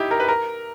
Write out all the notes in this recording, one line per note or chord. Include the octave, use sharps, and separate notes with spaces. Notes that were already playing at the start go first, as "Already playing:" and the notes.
Already playing: D#4 E4 G4
A#4
B4
A#4